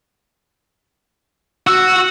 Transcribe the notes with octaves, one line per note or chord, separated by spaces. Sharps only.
F#4 E6